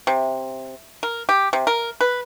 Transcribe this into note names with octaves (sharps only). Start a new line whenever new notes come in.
C3
A#4
G4
C3
A#4
B4